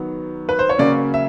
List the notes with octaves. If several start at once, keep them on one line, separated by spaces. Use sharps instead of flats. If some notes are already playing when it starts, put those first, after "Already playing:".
Already playing: D#3 F#3 B3
B4
C5
C#5
C#3 F#3 A#3 C#4 D5
E5